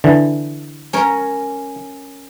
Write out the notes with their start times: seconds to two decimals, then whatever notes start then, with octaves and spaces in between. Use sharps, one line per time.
0.04 D3 E3
0.93 C#4 A#4 C#5